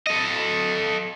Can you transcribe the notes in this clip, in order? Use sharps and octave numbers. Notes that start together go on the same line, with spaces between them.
A4 D#5